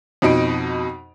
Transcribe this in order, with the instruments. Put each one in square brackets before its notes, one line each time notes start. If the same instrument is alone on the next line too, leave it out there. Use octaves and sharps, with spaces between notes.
[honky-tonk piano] F2 B2 D#4 D7